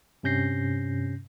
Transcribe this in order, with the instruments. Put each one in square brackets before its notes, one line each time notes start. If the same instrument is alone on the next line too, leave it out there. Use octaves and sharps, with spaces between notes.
[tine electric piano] G2 C3 C#4 G6 A#6 C7